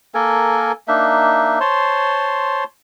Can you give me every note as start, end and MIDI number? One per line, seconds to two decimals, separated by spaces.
0.14 0.72 58
0.14 0.72 69
0.14 0.72 70
0.14 0.72 80
0.88 1.59 58
0.88 1.59 62
0.88 1.59 63
0.88 1.59 76
1.60 2.64 72
1.60 2.64 73
1.60 2.64 81
1.60 2.64 84